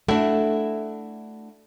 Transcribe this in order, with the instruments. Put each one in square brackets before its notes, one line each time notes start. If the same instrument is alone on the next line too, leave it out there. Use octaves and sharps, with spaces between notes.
[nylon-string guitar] A3 D4 [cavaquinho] E4 F#4 E5